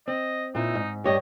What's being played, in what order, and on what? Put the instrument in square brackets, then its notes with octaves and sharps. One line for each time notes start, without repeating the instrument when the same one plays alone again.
[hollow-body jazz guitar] C4 [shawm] D#5
[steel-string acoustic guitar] A#2 E4 [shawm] D#4
[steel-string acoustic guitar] G#2
[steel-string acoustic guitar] G2 G4 [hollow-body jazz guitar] C#5 [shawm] D#5